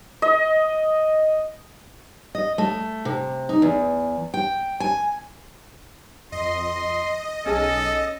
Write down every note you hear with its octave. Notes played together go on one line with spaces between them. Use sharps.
D#5
D#5
A3
C3
D#4
E2
G5
G#5
F2 D#5 C6
B1 C#4 G#4 A4 A5